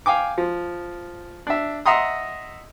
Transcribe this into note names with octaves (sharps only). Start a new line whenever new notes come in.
F5 G5 G#5 D6
F3
D4 E5
D#5 E5 F#5 A#5 C6 D#6